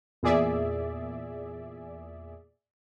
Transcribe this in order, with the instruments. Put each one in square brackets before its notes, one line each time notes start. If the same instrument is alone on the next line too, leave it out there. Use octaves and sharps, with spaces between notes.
[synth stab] E2 A#2 G#4 D5 E5